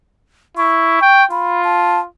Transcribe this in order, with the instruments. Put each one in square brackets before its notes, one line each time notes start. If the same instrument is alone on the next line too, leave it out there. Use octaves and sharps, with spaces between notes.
[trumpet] E4 [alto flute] C#6
[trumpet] G5
[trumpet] F4 [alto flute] B5
[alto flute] A5